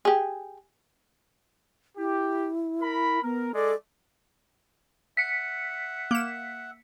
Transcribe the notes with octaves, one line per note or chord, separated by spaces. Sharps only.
G4 G#4
E4 G4
A#4 B5
B3 A#4
G#3 A4 D5
E5 F#5 B6 C#7
A#3 E7